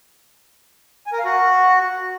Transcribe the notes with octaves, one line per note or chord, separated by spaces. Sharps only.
G#5
A#4
F5
F#4